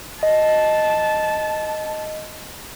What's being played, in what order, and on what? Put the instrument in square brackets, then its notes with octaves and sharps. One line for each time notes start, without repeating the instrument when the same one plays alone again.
[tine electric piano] D#5 [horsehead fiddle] A5